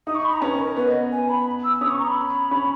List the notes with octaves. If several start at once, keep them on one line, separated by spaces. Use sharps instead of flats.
D#4 D#6
C#6
B5
A#5
C#4 B4
B4
A#4
B3 B4
D#5
G#5
B5
E6
C#4 D#6
C#6
A#5
B5
C#4